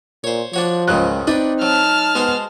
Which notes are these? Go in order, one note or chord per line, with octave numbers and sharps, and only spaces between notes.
A#2 C5 C#5
F3 D4 F#4 C#5
C#2 G#2 D#3 F#3 F#6
C4 D4 D#4 B4 D5
F#3 A5 F6
G#3 B3 F#4 C5